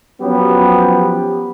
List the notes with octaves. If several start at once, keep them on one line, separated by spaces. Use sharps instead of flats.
F3 F#3 B3 C#4 G4